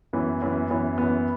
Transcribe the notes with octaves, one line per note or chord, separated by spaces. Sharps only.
F#2 E3 B3
F#2 E3 B3
F#2 E3 B3
F#2 E3 B3